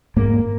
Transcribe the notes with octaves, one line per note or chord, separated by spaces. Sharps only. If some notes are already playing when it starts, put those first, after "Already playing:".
G#2 A#3